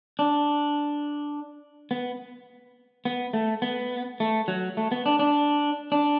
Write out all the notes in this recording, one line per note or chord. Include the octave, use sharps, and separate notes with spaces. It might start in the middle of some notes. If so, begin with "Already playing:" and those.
D4
B3
B3
A3
B3
A3
F#3
A3
B3
D4
D4
D4